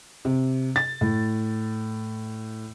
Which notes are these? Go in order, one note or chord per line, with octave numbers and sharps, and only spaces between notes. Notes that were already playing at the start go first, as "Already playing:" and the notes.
C3
A6
A2